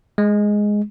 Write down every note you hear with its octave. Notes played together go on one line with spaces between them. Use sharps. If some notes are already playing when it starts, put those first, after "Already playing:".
G#3